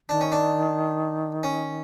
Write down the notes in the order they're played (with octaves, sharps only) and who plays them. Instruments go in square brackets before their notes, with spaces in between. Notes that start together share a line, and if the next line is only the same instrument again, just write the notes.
[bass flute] D#3 [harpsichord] D4
[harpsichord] C#4
D4
C#4